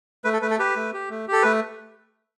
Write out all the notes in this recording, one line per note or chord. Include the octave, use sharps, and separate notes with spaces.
A3 B4
A4
A3 B4
A4
G4 B4
A3
G4
A3
G4 A4
A3 B4